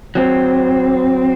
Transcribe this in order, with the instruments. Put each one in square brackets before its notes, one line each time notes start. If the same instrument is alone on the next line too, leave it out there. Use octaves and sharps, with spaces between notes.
[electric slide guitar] F#3 C4